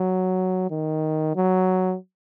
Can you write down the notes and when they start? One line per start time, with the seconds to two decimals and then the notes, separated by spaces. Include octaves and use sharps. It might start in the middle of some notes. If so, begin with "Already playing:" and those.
Already playing: F#3
0.71 D#3
1.36 F#3